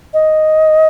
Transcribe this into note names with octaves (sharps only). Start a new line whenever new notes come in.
D#5